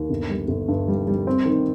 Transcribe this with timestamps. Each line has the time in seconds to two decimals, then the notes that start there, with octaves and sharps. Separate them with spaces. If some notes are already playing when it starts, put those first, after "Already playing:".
Already playing: D#2
0.10 G1
0.30 G3
0.48 G1
0.68 G2
0.88 G3
1.07 G3
1.27 C4
1.46 D#3